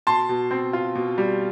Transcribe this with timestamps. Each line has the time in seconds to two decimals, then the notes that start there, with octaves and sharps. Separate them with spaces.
0.07 B2 A5 C6
0.29 B2
0.51 C4
0.73 F4
0.95 B2
1.18 G3